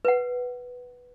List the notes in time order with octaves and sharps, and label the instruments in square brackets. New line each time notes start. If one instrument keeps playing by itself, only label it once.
[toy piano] B4 F#5